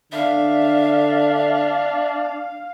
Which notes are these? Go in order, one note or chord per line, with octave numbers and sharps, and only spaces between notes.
D3 D4 E5 F5